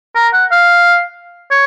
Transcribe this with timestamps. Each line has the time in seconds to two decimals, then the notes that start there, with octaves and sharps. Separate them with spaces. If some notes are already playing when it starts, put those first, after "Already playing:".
0.15 A#4
0.33 F#5
0.52 F5
1.51 C#5